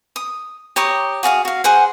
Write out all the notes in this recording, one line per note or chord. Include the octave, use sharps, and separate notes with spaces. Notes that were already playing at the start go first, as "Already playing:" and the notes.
D#6
G4 C#5 A#5 D#6
F#4 G#4 F5 D#6
F#4 F5
G#4 C5 F#5